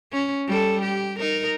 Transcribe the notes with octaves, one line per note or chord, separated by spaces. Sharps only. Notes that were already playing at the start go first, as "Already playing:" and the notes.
C#4
G3 A4
G4
D#4 A#4